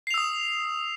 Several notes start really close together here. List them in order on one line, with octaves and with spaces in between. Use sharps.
C7 F7 E6 D#6